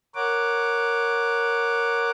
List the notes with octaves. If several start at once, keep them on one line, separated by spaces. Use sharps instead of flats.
A#4 C#5 F#5 D6